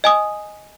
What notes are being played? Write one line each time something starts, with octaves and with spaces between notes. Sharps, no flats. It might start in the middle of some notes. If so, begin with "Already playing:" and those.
D#5 G#5 D#6